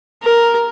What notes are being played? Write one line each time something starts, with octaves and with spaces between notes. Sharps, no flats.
A#4